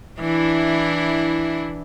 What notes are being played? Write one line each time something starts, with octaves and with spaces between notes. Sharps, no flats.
E3 D4 E4